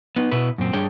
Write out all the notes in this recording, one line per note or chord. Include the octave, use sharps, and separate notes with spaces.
B3 D#4
B2 E4 B4
F#2 A#2 C4
G2 G3 D4 G#4 C#5 G5